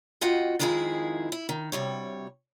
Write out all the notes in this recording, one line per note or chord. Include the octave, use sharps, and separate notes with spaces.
F2 F4 F#4 D#5 F#5 G5
F2 D#3 F3 G#3 E4 G#4
E4
D#3
D2 C3 G3 C#5